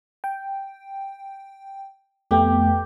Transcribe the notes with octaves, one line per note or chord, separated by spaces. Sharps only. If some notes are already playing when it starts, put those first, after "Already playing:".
G5
F2 A3 B3 G4